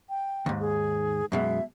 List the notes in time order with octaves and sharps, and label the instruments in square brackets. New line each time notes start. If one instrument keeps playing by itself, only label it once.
[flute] G5
[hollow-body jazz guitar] D#2 G#2
[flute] G#4
[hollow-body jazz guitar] F#2 B2 G#3 [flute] E5